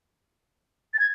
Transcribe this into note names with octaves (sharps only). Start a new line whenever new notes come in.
A6
G#6